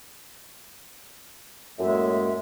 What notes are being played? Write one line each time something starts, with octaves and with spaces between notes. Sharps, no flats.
F#2 A2 F#3 G#3 A#3 E5